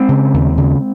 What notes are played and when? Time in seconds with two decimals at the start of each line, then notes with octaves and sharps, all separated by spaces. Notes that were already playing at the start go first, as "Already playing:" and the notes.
Already playing: G#3 C4
0.09 C#3
0.34 D#2
0.57 C#3